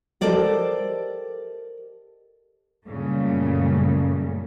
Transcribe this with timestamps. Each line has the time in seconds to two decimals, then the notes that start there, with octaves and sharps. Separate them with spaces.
0.21 G4 A4 A#4 C5 D5 D#5
2.85 F#2 A#2 C#3 G3 A3